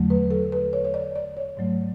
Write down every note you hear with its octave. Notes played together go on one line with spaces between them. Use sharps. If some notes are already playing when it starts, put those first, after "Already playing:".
Already playing: E2 D3 F#3 A3
B4
A4
B4
C#5
C#5
D5
D5
C#5
G#2 F#3 A3